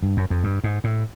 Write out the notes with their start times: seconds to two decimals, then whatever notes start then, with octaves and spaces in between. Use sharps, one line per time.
0.03 G2
0.17 F#2
0.30 F2
0.44 G2
0.64 G#2
0.84 A2